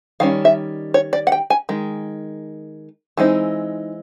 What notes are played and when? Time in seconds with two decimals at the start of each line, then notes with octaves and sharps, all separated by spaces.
0.20 D#3 G3 C#4 F5
0.45 E5
0.94 C#5
1.13 D5
1.27 F#5
1.32 G5
1.50 G#5
1.69 D#3 G#3
3.17 E3 G#3 C4 D#4